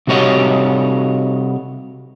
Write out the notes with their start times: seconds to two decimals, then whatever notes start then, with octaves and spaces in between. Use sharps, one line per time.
0.07 C3 G3 F#4 C#5 D#5